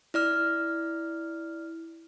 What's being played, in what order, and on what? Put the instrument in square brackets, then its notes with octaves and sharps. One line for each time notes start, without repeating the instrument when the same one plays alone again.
[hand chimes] E4 D5 F6